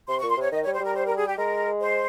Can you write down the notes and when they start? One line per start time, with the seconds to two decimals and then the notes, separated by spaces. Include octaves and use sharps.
0.08 C3 C6
0.19 C#6
0.23 A#2
0.30 C6
0.37 C3 C#5
0.52 D#3 D#5
0.63 C#5
0.67 G3
0.73 C5
0.80 G3 A#4
0.95 C5
1.06 A#4
1.17 G#4
1.27 G4
1.38 G#3 A#4
1.81 C5